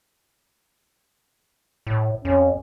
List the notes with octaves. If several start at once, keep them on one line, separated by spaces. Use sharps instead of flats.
A2
F2 C#4